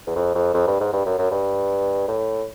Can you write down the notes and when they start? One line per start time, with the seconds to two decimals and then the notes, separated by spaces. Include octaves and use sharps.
0.07 E2
0.15 F2
0.35 F2
0.54 F2
0.67 G2
0.80 G#2
0.93 G2
1.06 F#2
1.19 F#2
1.31 G2
2.08 A2